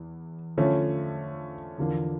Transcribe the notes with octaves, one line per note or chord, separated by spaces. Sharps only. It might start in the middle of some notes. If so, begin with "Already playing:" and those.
Already playing: E2
D3 F3 A3 C#4
E2 D3 F3 A#3 D4